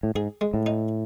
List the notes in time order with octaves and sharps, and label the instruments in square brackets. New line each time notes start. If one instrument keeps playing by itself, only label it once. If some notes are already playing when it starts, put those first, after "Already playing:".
[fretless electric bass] A2
[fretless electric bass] G#2 [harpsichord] G#4
[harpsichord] G#3
[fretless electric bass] A2
[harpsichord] D#4